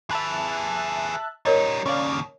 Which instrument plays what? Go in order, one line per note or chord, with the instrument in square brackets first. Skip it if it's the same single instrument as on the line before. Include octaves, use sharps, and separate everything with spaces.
[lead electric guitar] G#4 B4 [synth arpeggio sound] E5 A5 F#6
[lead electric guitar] G3 D#4 [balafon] A#4 C#5 D#5
[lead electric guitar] D#2 C#3 [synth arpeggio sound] C#4 D5 F5